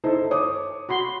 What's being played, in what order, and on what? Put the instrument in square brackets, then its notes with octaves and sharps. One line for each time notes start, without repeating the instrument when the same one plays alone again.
[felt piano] D#4 E4 C5 [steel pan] A4
[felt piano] C#5 D6 D#6
[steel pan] F#4 B5 C6